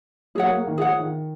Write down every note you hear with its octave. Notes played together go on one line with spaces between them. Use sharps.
F#3 G#4 C#5 F#5
A#3
A#3
D#3
F3 G#4 C#5 F#5
D#3